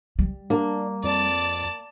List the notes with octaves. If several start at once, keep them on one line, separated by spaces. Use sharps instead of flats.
G3
A#3 D4
F2 D5 A5